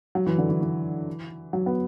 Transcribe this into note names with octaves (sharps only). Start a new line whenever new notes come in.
F#3
E3
D3
E3
E3
F#3
B3